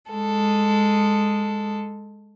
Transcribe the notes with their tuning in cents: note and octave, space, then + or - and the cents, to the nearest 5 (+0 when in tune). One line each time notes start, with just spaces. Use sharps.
G#3 -5 A4 +0